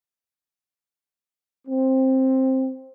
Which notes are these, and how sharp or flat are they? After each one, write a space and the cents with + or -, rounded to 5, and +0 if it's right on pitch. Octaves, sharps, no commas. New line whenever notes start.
C4 +10